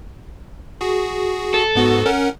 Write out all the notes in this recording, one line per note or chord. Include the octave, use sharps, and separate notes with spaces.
F#4 G#4
A4
G#2 B3 F#4
C#4 A#4 F#5